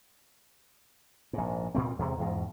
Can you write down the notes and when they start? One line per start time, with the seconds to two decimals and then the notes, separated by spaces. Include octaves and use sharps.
1.33 A#1 G#2
1.75 D2 A#2 A3 C4
1.99 E2 C3 G#3
2.18 E2 G#2 B2